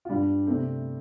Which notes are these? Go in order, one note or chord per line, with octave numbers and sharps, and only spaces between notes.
F4
G2 G3 D4
C3 A3 C4